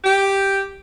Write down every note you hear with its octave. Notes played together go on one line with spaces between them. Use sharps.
G4